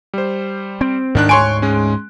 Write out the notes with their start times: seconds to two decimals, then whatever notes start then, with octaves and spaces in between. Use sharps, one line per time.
0.14 G3 C5
0.81 C4
1.15 D2 G#2 D#3 D4 F#6
1.29 C#5 G#5 C6 C#6 D7
1.62 G#3 C#4